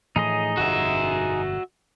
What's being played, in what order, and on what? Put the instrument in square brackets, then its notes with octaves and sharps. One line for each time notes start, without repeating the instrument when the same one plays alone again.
[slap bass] A2 E3 F3 [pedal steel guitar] D#4 G#4 D#5
[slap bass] G1 F2 B2 [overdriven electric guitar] F#4 E5